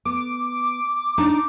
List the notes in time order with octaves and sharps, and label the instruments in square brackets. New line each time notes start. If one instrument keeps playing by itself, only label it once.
[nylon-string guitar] B3 [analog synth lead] D6
[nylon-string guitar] D4 D#4 F#5